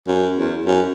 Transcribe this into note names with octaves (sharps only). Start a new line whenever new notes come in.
F#2
E2
F#2